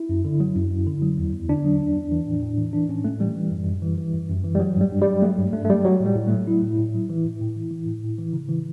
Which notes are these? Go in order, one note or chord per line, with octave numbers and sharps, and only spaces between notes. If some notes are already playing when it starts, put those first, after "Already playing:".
Already playing: E4
F#2
D3
F#3
F#2
F#2
D3
F#3
E2
E2
D3 D4
F#3
E2
E2
E3
A2
A2
E3
E3 D4
A2 C#4
A2 A3
E3 G3
E3
F#2
F#2
E3
E3
F#2
F#2
E3
G3
F#3
G2 G3
G2
F#3 G3
F#3 A3
G2
G2 A3
A3
F#3 G3
F#3
A2
G3
A2
F#3 A3
F#3 E4
A2
A2
F#3
E3
A2
A2
E3
E3
A2
A2
E3
C#3
E3